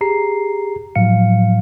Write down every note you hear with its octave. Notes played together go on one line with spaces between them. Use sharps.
G4 G#4 A#5 C7
A2 F3 F#3 F5 C#7